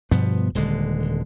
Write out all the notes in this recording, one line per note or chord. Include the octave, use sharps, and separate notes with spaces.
G2 B2 F3 B3
D#1 D3 G#3